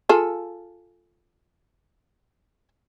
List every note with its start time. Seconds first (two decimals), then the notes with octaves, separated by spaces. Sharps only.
0.09 F4 G#4 A4